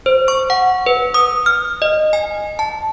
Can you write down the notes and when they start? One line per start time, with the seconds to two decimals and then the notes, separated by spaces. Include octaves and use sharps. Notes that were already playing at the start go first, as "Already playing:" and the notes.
0.06 C5
0.28 C#6
0.50 F#5
0.86 B4
1.14 D#6
1.46 F6
1.82 D#5
2.13 G#5
2.59 A5